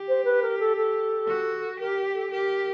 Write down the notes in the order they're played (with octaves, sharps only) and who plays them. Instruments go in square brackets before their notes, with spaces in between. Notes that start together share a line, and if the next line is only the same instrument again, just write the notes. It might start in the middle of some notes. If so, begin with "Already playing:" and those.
Already playing: [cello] G4
[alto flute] C5
B4
A#4
A4
A4
[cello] F#4
[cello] G4 [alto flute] A#4
[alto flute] A4
[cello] G4 [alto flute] A#4